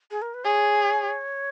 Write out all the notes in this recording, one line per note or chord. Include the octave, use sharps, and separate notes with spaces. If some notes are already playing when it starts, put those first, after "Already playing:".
G#4
A#4
B4
G#4 C#5